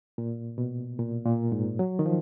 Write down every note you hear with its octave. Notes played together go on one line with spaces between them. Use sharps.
A#2
B2
A#2
A#2
G#2
F#3
D#3
F3